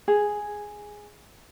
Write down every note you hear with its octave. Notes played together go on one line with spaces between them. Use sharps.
G#4